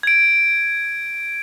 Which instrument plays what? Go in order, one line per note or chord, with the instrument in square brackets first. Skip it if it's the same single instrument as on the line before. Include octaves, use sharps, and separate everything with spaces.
[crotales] G#6 D7